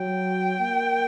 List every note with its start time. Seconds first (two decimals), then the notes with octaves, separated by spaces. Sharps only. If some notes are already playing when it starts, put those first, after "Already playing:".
Already playing: F#3 G5
0.61 A#3